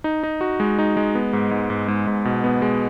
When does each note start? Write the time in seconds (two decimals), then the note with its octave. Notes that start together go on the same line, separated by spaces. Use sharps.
0.04 D#4
0.23 D#4
0.41 F#4
0.60 G#3
0.79 D#4
0.97 G#3
1.15 B3
1.33 G#2
1.51 G#2
1.70 G#2
1.88 G#2
2.07 G#2
2.25 B2
2.44 B3
2.62 G#3